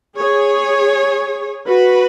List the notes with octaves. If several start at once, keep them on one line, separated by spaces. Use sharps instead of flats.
G#4 C#5
F#4 B4